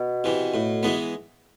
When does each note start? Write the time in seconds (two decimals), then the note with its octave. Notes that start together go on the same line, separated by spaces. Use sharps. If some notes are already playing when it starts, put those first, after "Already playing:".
Already playing: B2
0.24 C3 E3
0.54 A2
0.83 E3 G#3 B3